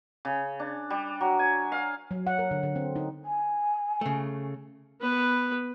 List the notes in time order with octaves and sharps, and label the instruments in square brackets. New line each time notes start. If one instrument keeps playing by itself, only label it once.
[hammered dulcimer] C#3
D4
G3
F#3
G#5
F5
[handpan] F#3
F#5
A#4
D3
D3
C4
D#4
[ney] G#5
[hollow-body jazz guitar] C#3 A3
[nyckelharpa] B3 B4